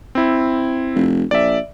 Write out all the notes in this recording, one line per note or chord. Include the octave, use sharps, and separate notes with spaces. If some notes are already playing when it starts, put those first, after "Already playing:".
C4 E4
F1
A#1 D5 E5